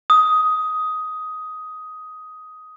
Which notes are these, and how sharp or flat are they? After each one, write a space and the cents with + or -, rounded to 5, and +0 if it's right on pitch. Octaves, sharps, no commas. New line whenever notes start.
D#6 +10